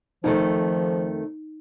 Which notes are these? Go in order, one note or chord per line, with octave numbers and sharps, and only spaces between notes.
F2 D#3 F3 A3 D#4